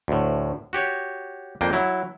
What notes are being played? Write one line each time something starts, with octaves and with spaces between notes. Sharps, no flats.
D2 A2
F#4 G4 C#5
F2 A#3 D4 G5
F#3 E4